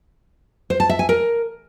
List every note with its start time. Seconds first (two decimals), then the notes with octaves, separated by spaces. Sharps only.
0.70 C5
0.80 A5
0.89 E5
0.99 G#5
1.09 A#4